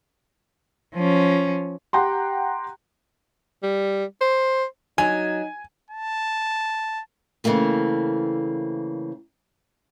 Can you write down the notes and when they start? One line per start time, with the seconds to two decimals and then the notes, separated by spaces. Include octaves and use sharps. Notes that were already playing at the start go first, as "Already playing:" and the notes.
0.95 F3 C#4
1.93 G4 F#5 G5 A#5 C6
3.63 G3
4.21 C5
4.98 F#3 D#4 G#5
5.91 A5
7.44 C#3 E3 A3 A#3 C4